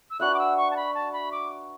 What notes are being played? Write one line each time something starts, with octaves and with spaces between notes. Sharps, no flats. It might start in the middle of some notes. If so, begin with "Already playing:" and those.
E6
D4 F#4 B4 E5 F#6
D6
E6
C#6
A5
B5
A5
B5
D6